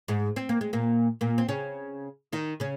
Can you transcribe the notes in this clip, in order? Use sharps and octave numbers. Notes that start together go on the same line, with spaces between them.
G#2 G#3
C4
A#3
G#3
A#2 A#3
A#2 A#3
C4
C#3 C#4
D#3 D#4
C#3 C#4